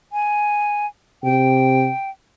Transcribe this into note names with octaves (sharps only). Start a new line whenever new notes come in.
G#5
C3 G5